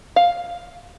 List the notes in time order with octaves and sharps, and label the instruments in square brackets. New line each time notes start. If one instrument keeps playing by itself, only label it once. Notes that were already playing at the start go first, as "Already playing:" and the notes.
[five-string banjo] F5